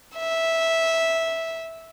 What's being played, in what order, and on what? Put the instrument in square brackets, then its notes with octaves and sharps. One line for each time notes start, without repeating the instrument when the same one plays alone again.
[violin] E5